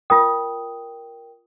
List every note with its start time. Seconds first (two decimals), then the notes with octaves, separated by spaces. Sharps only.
0.10 F4 A#4 G5 D#6